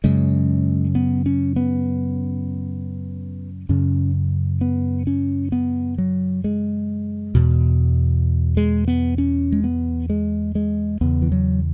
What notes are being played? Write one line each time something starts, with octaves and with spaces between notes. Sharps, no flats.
F#2 C#3 G#3
B3
C#4
B3
F#2 C#3 C#4
B3
C#4
B3
F#3
G#3
E2 B2
G#3
B3
C#4
G#3
B3
G#3
G#3
E2 C#3 B3
E3
F#3